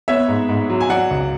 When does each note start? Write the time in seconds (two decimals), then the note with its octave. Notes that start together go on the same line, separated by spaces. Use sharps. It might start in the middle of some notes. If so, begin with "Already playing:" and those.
0.08 B3 C#5 E5
0.29 G#2
0.49 G#2
0.70 F#3
0.81 G#5
0.90 F#3 D5 F#5
1.11 C#2